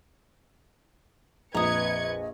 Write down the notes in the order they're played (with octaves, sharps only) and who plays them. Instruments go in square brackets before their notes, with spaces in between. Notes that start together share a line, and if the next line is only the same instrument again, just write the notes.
[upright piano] A#1 F2 [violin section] B4 G#6 C#7 [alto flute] D#5 [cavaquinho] A#5 D#6